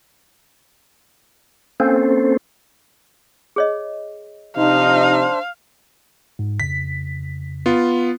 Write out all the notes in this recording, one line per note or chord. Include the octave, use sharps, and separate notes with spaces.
A#3 C4 C#4 A4 C5
G#4 C#5 D#5
C3 F3 D4 D#4 C5 F5
G#2
F2 C#3 B6
B3 F4